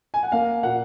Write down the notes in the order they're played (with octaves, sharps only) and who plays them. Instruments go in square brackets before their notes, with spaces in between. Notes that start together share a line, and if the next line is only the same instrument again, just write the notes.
[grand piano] G#5
F#5
A#3 F5
A#2 F#5